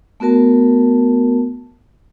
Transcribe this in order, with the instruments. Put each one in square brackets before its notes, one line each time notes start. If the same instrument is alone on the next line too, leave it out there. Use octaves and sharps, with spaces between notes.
[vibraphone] A3 B3 F#4 A#4 A5